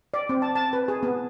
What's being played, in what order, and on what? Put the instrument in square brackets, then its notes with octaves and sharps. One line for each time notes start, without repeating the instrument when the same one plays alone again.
[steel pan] D5
C4
A5
A5
B4
G#4
B3